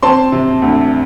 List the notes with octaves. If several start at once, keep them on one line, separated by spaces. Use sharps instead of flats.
C4 A5 C6
C3
D2